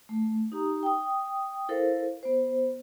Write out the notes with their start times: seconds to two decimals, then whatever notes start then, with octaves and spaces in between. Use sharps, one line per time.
0.09 A3
0.52 D#4 G4 A#5 D#6
0.83 G5 D#6
1.69 E4 A4 A#4 C5 F5
2.23 B3 C5